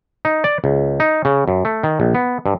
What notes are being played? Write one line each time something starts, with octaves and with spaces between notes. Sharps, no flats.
D#4
D5
C#2
D#4
C#3
F#2
A3
D#3
A#1
B3
G2